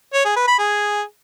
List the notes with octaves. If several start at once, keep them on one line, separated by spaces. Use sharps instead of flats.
C#5
G#4
B4
B5
G#4